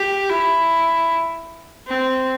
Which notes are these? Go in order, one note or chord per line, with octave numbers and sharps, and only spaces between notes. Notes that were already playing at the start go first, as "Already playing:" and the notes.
Already playing: G4
E4
C4